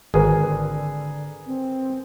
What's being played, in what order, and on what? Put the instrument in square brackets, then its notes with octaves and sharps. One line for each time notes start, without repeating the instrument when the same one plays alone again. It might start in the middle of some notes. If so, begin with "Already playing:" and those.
[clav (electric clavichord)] G#1 [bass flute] D3 [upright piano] G#4 A#4 B4
[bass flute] C4